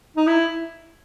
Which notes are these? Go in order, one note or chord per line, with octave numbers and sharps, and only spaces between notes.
D#4
E4